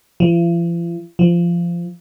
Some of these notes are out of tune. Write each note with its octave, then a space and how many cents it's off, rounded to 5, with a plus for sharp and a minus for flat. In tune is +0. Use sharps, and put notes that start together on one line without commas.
F3 -45
F3 -20